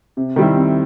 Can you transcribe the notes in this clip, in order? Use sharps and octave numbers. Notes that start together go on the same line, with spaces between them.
C3
D#3 G3 C4 E4
C3